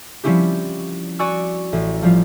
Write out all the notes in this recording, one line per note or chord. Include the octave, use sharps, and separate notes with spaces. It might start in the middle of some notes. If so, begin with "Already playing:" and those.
F3 G3 C4 C#4 E4 G4
F#4 D5 G#5 C#6 E6
A1
F3 G3 F4